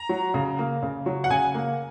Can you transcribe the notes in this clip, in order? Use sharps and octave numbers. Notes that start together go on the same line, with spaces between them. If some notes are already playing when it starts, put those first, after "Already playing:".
Already playing: A#5
F#3
C#3
A#3
C#3
F#3
F#5
C#3 G#5
A#3